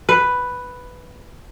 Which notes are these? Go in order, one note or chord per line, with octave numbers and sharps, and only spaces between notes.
B4